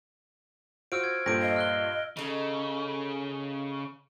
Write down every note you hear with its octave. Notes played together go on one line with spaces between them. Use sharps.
F4 F#4 C5 E6 F6 D7
G#6
G2 A#2 F4 A4 C5 G5 A#6 D7
D#5 F5
F6 F#6 G7
C#3 D#4 A4